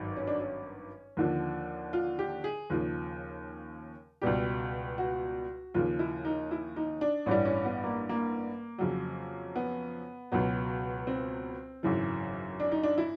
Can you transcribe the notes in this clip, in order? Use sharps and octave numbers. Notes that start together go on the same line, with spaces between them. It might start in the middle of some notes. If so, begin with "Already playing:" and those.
Already playing: G#1 G2 D#3 F#3
C#4
D4
C#4
D#2 D3 F3
F4
G4
G#4
D#2 C#3 F3
C#2 B2 G3 G4
F#4
D#2 C#3 F3 F4
E4
D#4
E4
D#4
D4
A1 G2 E3 G3 C#4
C#4
B3
A#3
A#3
F2 C#3 F#3
B3
C#2 B2 F#3
C4
G#1 F#2 C#3 E3
D4
D#4
D4
E4